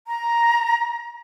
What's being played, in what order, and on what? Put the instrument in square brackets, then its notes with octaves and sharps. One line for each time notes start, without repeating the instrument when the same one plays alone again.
[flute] A#5